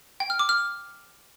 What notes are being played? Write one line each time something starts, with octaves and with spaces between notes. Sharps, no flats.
G5
F6
D6
F6